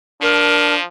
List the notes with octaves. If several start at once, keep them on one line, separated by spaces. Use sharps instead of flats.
F3 D4 A#4